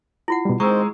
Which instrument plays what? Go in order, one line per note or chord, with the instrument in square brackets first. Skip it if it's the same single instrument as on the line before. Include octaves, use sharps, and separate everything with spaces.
[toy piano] E4 F4 F#5
[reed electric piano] B2 G3
[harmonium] D#3 C4 C5 [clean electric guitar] G#3 [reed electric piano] A#5 E6 [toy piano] C#6